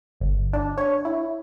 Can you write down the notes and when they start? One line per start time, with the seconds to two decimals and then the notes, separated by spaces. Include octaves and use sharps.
0.20 G1
0.53 D4
0.78 C#5
1.05 E4